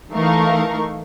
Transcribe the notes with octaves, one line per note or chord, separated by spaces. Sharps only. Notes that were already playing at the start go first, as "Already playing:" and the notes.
E3 A3 D#4 A#4 F5 C#6